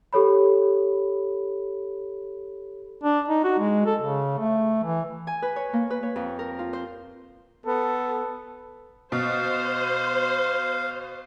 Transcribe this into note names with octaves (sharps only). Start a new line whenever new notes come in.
G4 A4 C#5 B5
D4
D#4
F#4
G#3
A4
C#3
A3
E3
G#5
B4
C#5
A#3
B4
C#5
F2
A#4
F4
C5
B3 A4
B2 C5 F5